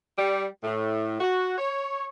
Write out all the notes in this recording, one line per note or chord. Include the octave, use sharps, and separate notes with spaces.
G3
A2
F#4
C#5